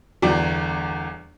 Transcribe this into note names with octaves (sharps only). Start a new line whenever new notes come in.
G1 E2 D5 D6